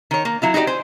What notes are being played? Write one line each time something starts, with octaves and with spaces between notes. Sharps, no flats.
D#3 C#5
A#3
F#3 E4 F4
D#4 F#4 G4 B4 D5
C5 G#5